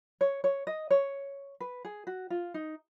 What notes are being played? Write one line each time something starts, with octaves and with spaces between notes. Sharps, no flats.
C#5
C#5
D#5
C#5
B4
G#4
F#4
F4
D#4